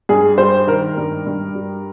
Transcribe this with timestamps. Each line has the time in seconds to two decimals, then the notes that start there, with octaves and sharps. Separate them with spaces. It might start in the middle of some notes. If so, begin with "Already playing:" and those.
0.09 G2 G#4
0.38 G3 C5
0.67 D#3 A#4
0.97 G2
1.27 G2
1.55 G3